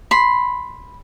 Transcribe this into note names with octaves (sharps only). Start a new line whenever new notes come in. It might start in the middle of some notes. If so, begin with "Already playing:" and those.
B5 C6